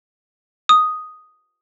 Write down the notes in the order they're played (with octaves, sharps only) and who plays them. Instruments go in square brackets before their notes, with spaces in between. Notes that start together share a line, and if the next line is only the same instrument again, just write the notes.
[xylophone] D#6